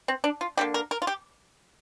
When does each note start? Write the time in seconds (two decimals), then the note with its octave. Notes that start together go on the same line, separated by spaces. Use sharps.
0.08 C4
0.24 D4
0.41 F4
0.57 D3 G3 A#3 G4
0.74 A#4
0.91 A#4
1.02 F4
1.07 G4